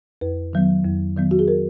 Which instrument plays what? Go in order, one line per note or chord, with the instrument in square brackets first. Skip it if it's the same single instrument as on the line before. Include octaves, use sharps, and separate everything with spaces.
[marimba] F2 B4
D#3 F#3 B3
F2
D#3 F#3 B3
F#4
G#4
A#4